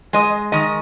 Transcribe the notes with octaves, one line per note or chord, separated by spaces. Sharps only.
G#3 D#5
D#3 D#5